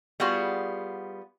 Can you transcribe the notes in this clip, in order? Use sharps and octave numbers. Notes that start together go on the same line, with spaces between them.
G3 B3 F4 F#4 G#4